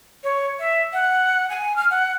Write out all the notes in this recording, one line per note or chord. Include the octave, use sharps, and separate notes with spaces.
C#5
E5
F#5
G#5
F6
F#5